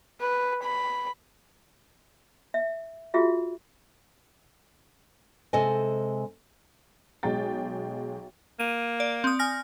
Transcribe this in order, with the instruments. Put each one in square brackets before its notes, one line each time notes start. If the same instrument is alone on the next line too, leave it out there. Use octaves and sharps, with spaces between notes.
[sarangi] B4
B5
[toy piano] E5
F4 F#4 G#4 E5
[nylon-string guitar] C3 G#3 A4 C5 D#5 G#5
[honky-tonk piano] B1 G#3 G#4 G5 A6
[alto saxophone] A#3 [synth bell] D#7
[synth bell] D5
C4 D#6
G#5 F6 A#6